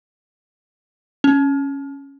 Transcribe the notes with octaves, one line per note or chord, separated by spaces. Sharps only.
C#4